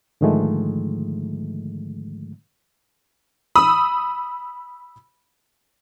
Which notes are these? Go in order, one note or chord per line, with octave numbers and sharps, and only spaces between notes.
G#2 D3 D#3 F3 G#3 A3
B5 D#6 E6